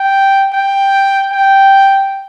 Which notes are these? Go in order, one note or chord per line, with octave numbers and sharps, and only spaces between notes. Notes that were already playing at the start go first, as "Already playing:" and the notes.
Already playing: G5
G5
G5